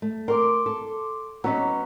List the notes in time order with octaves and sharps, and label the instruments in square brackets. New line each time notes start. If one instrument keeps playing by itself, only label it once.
[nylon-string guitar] A3
[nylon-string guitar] A#4 [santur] C6 D6
[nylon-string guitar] A4
[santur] F#3 B5 [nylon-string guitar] B3 C#4 D#4